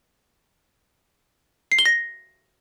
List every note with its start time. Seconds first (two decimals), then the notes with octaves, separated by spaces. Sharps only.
1.72 C7
1.79 G7
1.86 A#6